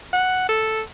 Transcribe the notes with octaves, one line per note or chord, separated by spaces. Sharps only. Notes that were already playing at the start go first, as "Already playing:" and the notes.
F#5
A4